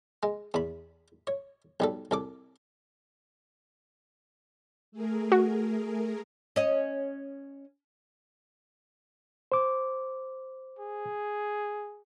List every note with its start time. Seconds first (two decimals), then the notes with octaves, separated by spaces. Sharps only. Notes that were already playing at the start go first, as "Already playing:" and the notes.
0.23 G#3
0.54 E2 B5
1.27 C#5
1.80 B1 G3 A4
2.11 C2 A4 D6
4.92 A3 G#4 A#4
5.32 F#4
6.56 C#4 D#5
9.52 C5 D6
10.79 G#4